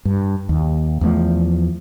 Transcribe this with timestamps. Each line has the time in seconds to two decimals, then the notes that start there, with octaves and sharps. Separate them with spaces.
0.05 G2
0.49 D#2
1.01 E2 F3 A3